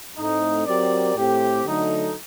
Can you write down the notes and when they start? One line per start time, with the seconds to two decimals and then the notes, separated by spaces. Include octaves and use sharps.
0.17 A2 A3 C4 D#4
0.66 F#3 C4 G4 A#4 D5
1.15 A2 A3 C4 G4
1.65 D3 F#3 A3 D#4 A4